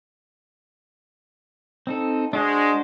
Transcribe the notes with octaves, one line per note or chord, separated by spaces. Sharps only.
C4 D#4 A4
G#3 D4 F#4 C5